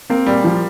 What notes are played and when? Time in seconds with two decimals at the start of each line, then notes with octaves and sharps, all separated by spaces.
0.10 A#3 C4
0.26 A#2 G3
0.44 F3